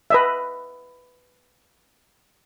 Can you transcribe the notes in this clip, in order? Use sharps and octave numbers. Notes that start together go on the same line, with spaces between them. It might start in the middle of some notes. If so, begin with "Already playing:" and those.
B4 D#5 E5